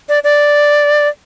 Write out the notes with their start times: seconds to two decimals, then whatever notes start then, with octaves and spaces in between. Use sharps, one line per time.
0.09 D5
0.24 D5